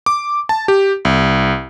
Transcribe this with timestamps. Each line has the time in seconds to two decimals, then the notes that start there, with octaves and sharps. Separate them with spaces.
0.06 D6
0.49 A5
0.68 G4
1.05 C2